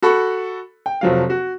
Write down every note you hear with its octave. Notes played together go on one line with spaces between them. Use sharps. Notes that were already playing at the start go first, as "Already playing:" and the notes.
F#4 A4 B5 C#6
G5
F1 F3 F#3 F5
F#4